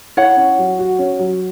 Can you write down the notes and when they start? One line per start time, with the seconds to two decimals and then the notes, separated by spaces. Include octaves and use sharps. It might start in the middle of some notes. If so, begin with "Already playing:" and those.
0.17 E4 C#5 F#5
0.37 C#4
0.58 F#3
0.79 F#4
0.99 C#4
1.19 F#3